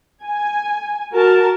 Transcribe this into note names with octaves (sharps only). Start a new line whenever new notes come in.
G#5
F#4 A#4 A5